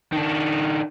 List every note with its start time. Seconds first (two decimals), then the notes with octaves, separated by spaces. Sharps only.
0.12 D#3 D4